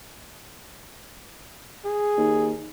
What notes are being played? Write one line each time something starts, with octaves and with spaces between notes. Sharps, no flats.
G#4
D#2